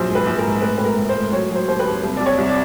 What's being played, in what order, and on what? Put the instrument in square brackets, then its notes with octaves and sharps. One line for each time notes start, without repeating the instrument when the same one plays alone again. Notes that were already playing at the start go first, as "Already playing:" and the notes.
Already playing: [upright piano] A#1 F#3 C5
G#2
B4
A#1
A#4
G#2
A2 B4
A2 B4
A#4
A2
C5
A2
F#3 C#5
F#3
C5
D#2 C5
B4
D#2
C2
C2 D5
C#5
C2
D5